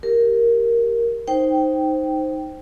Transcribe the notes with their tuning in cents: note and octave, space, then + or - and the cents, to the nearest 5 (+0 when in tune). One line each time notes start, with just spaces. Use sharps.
G4 +0 A#4 +0
D#4 +0 C5 +0 G5 -10